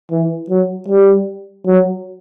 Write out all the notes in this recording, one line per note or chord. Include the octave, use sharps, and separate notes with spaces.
E3
F#3
G3
F#3